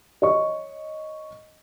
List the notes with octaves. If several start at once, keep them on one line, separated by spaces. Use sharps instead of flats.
C#5 D#5 C#6